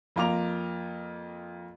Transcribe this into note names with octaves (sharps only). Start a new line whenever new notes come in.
F2 A#3 F4 A#5 D6 F7